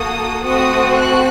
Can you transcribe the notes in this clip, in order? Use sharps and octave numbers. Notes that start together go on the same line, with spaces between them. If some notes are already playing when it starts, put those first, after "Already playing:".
Already playing: A#3 F#4 A4 D#6
A3 C4 F#4 D#6
F#6